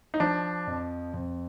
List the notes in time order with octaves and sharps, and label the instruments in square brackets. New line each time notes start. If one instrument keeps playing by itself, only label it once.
[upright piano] D#4
[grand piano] F3 [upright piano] D4
[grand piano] F2
F2